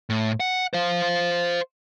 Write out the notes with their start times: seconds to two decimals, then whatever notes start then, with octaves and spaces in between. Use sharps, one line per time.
0.10 A2
0.40 F#5
0.73 C5 F5